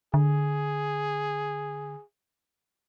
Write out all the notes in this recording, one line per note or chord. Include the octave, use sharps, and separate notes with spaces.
D3 G#4